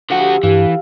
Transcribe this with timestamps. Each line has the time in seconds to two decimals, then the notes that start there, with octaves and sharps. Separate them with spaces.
0.10 D3 F3 F#4 G4 A4
0.43 G2 E3 G4 F5